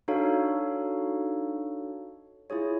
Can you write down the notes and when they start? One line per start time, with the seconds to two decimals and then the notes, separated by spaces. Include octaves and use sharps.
0.08 D4 D#4 F#4 A4 C#5 F5
2.50 E4 F4 G#4 C#5